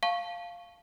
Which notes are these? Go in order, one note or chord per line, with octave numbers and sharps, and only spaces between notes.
F5 A5 C#6